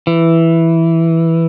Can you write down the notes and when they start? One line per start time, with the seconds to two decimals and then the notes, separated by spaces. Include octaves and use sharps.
0.07 E3